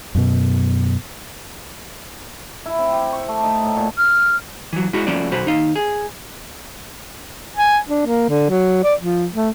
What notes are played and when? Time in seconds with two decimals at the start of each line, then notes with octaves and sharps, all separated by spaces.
0.15 F#2 B2
2.66 E4
2.79 C4
2.93 G4
3.12 C#6
3.28 A3
3.44 D#4
3.63 A2
3.77 A#2
3.98 F6
4.73 E3 F#3
4.93 G#3 E4 F#4
5.07 F3 A3 C#4 F#4 D5
5.31 B1 F#4 C5 B5
5.46 D#2 D#4 F5
5.76 G#4
7.57 G#5
7.89 D4
8.06 A#3
8.29 D3
8.50 F#3
8.84 D5
9.01 F3
9.35 A3